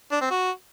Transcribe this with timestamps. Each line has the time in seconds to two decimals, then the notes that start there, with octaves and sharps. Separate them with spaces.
0.12 D4
0.21 C4
0.31 F#4